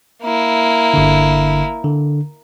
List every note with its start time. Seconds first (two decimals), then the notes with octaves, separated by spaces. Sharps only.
0.23 A#3 E4
0.94 G1 D3
1.84 D3